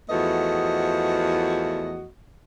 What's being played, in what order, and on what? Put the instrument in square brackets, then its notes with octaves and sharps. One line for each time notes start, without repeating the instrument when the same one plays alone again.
[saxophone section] E2 F3 A3 B3 F#4 D#5